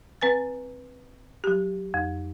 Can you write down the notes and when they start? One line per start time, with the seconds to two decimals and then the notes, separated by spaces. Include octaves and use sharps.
0.21 C4 B4 G#5 A6
1.44 F#3 G4
1.94 F2